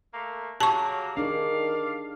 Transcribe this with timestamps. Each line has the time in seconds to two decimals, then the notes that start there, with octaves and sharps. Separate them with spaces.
0.14 A3 A#3
0.60 C#3 F#3 A#3 G4 A5 C#6
1.17 D#3 D4 G#4 D5 F5